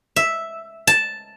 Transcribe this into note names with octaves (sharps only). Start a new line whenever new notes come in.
E5
A5